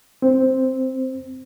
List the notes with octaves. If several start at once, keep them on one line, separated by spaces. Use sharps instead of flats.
C4